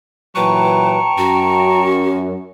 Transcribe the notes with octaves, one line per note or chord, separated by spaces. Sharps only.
A#2 E3 F#3 B4 G5 A5 A#5 C#6
F#2 F#4